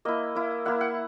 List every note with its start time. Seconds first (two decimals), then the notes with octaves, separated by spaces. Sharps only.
0.05 A#3 E4 D#5
0.35 A#3 E4
0.65 A#3 E4 F#5
0.81 F#5